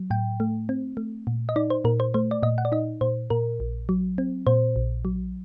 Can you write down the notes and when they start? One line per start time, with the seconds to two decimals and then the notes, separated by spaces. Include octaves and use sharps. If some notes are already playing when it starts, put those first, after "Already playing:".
Already playing: F#3
0.10 A2 G5
0.40 A3
0.69 C4
0.97 A3
1.27 A#2
1.49 D#5
1.56 D#4 D5
1.70 C5
1.84 A#2 A#4
2.00 C5
2.14 A3 C5
2.31 D5
2.43 A#2 D#5
2.58 F#5
2.65 D5
2.72 D#4 D#5
3.01 A#2 C5
3.30 A#2 A#4
3.60 A#1
3.89 F#3
4.18 C4
4.47 A#2 C5
4.76 A#1
5.05 F#3